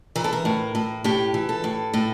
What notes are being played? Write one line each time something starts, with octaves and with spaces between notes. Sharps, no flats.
E3 A#4
A4
A#4
A2
A2
A2 G4
E3
A4
A2
A2